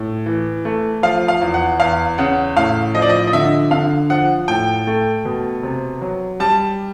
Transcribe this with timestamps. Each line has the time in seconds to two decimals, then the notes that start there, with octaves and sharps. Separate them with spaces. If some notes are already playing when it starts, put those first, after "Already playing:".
Already playing: A2
0.26 E3
0.65 A3
1.03 F3 F5
1.28 F5
1.42 E2
1.54 F#5
1.80 E2 F5
2.18 C#3 F#5
2.57 A2 F5
2.95 F3 D#5
3.02 D5
3.10 D#5
3.27 D#5
3.33 D3 E5
3.71 D3 F5
4.10 F3 F#5
4.48 A2 G5
4.87 A3
5.25 B2
5.63 C3
6.01 F#3
6.40 G3 A5